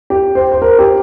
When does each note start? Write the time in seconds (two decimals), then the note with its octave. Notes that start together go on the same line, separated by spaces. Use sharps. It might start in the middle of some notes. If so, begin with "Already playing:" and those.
0.10 G4
0.35 C5
0.52 C5
0.62 A#4
0.79 G4